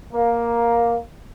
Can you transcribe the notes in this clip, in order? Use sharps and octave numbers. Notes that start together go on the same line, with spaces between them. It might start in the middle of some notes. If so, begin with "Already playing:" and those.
A#3